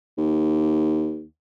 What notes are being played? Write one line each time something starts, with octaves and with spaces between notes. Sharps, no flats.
D#2